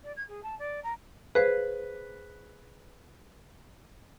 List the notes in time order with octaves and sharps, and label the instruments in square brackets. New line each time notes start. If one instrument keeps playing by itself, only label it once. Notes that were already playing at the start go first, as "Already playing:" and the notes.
[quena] D5
G#6
G#4
A5
D5
A#5
[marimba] G#4 C5 F5 [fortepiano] B4